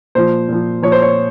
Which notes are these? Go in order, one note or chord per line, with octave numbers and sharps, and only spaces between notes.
A#2 F3 C5
A#2 F3
A#2 F3 C#5
C5
C#5